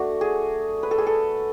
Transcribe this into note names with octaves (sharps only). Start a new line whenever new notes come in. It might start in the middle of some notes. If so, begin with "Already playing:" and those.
Already playing: A3 D4 F#4
G#4
B4
A4
G#4
A4